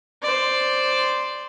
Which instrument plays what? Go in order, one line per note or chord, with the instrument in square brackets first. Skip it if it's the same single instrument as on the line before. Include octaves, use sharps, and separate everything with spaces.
[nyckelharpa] C5 D5